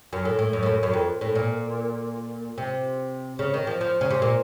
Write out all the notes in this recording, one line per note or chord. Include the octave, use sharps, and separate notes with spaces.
F#2
A2
A2
F#2
A2
F#2
F#2
F2
A2
A#2
C3
C#3
D#3
F3
F3
C#3
C3
A#2